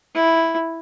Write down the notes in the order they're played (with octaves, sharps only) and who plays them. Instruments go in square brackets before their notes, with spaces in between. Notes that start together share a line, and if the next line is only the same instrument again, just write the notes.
[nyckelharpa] E4